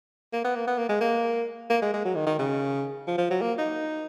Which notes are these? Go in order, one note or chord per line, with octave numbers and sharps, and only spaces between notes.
A#3
B3
A#3
B3
A#3
G#3
A#3
A#3
G#3
G#3
F#3
D#3
D#3
C#3
F3
F3
F#3
A#3
D#4